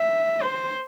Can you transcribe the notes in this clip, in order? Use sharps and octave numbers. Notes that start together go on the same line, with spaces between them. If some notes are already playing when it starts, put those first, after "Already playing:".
Already playing: E5
C5